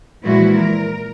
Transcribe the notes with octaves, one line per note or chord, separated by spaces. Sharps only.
A#2 E3 F3 G#3 E4 F#4
A#4